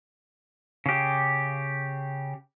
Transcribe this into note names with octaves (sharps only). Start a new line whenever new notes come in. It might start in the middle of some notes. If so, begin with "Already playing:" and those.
C#3 G4